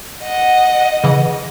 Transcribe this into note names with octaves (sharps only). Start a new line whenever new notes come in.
D#5 F#5
C#3 E3